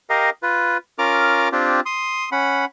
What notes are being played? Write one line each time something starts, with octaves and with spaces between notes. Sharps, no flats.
G4 A#4 D#5 F5
F4 B4
C#4 F4 A#4 D6 F6
C4 D4 F4 G4
C6 D#6
C#4 F#5 B5